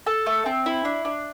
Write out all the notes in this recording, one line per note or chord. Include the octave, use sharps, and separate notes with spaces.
A4
A3
C4
E4
D4
D4